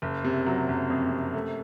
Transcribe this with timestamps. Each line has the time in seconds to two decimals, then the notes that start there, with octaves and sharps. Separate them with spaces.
0.02 F#1
0.24 C3
0.46 F#3
0.68 F#1
0.90 F2
1.11 C3
1.34 A3